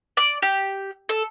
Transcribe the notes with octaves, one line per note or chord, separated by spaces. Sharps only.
D5
G4
A4